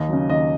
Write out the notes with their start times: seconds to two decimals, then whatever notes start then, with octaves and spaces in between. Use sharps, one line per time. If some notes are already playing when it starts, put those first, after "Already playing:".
Already playing: D#2 D#5
0.09 C#3 F#3
0.29 D#2 D#5